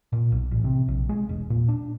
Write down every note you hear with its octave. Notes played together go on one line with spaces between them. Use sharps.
A#2
B1
A1
C3
A#1
G#3
E1
A#2
D4